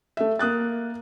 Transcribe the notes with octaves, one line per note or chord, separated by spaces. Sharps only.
A3 E5
A#3 D#6 F#6 A6